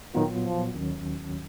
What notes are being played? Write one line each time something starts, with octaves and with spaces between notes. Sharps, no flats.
A#2 D#3 F#3 B3 F4
F3
D#2 D#3 F#3 C#4